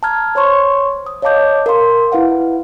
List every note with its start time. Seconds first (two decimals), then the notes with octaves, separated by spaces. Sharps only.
0.03 A5 A#5 F6 G#6
0.35 C5 C#5 C6 C#6
1.06 D#6
1.22 C#5 D#5 F5 A5 D6 G6
1.66 A#4 F5 C6
2.12 E4 B4 F5 F#5